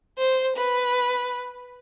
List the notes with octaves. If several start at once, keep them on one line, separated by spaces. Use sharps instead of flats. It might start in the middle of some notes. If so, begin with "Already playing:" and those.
C5
B4